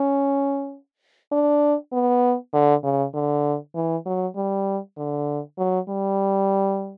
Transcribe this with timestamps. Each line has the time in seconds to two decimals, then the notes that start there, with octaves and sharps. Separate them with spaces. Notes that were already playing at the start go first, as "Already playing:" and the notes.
Already playing: C#4
1.32 D4
1.93 B3
2.53 D3
2.84 C#3
3.14 D3
3.75 E3
4.06 F#3
4.36 G3
4.97 D3
5.58 F#3
5.89 G3